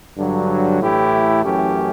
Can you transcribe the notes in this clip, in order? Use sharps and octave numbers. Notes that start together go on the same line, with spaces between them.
G2 D3 F#3
A2 E3 A3 E4 G4
F#2 E3 A3 C#4 G4